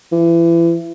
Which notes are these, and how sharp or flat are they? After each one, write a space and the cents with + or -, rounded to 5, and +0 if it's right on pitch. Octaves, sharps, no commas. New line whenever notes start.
E3 +30